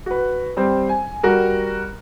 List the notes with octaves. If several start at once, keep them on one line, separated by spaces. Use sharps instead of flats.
F#4 B4
G3 C4 C5
G#5
G3 F#4 A#4